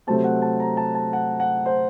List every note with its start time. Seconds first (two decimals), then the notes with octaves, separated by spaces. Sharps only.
0.07 C3 F#3 A3 C4 A5
0.24 F#5
0.42 A5
0.60 A#5
0.77 A5
0.95 A5
1.13 F#5
1.40 F#5
1.66 C5